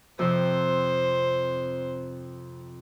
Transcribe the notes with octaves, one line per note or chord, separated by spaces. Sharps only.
F2 C3 C5